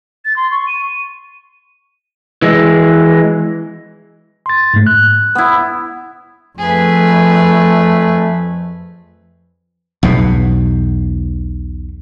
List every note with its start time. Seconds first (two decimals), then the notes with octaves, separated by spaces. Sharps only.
0.25 A6
0.36 C6
0.51 C#6
0.67 D#7
2.42 E3 G#3
4.46 C6 A6
4.74 G#2 A3
4.87 F#6
5.35 B3 E4
6.58 F2 A3 G#4 B4
10.03 B1 E2 B2